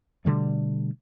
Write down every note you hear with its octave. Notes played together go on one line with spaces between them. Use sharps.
B2 D3 G3 A3